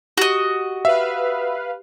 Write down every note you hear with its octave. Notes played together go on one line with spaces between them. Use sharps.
F#4 G4 D#5
B4 E5 F5